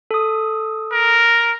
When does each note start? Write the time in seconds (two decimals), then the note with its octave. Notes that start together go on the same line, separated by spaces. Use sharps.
0.11 A4 D#6
0.92 A#4